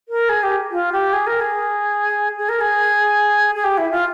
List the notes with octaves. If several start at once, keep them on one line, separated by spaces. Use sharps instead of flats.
A#4
G#4
G4
F4
G4
G#4
A#4
G#4
G#4
A#4
G#4
G#4
G4
E4
F4